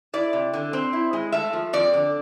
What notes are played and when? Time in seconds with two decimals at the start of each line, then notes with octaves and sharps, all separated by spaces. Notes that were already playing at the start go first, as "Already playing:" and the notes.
0.13 E4 D5
0.33 C3
0.53 D3
0.73 C4
0.93 E4
1.13 G#3
1.32 A3 E5
1.53 F3
1.73 F2 D5
1.94 D3